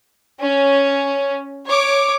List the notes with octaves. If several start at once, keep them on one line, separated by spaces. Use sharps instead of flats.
C#4
C#5 D6